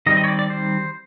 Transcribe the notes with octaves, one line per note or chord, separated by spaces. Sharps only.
D#3 G3 C4 D#5
D#5
C#5
D5
D5
C5